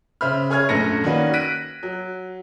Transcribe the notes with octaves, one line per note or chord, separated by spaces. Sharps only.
C#3 C5 E5 B5 F6
G#4 C#5 G#5 F6 G#6
A#1 F#2 A3 B4 A#6 C#7
D#3 A#3 C#4 D4 F#4 B4
F#6 A#6 B6 D7 D#7
F#3